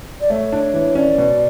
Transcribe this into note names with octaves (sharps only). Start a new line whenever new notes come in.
D5
A3 C#5
D4
E3
C#4 D5
B2